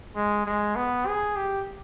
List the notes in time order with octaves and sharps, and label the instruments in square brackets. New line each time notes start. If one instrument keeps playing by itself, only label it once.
[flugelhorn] G#3
G#3
B3
G#4
G4